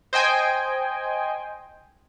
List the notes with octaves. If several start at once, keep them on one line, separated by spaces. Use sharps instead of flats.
C5 D#5 G5 G#5